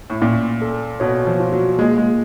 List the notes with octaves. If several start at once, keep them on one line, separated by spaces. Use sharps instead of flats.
A2
A#2 C#4
A4
B2 C#5
F3
F4
F#3
G#3 A#3
G#3